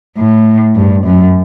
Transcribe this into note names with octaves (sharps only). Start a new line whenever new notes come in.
A2
G2
F#2